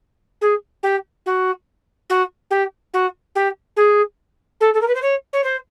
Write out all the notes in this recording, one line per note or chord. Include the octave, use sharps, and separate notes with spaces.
G#4
G4
F#4
F#4
G4
F#4
G4
G#4
A4
A4
A#4
B4
C5
C#5
C#5
C5